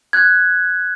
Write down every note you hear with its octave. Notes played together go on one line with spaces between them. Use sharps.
F#6 G#6